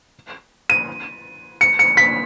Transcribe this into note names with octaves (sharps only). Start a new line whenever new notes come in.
D#7
C#7
C#7
B6